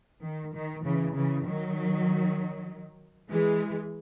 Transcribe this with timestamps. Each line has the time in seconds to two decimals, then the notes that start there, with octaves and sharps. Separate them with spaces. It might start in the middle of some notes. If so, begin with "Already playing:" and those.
0.23 D#3
0.54 D#3
0.84 C#3 E3
1.15 C#3 E3
1.46 D#3 F#3
3.29 E3 G#3